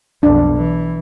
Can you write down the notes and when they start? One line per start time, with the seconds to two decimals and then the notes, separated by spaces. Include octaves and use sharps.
0.23 B1 F2 D4
0.57 E3